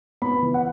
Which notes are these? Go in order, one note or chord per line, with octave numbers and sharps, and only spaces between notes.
B3 B5
E3
F#5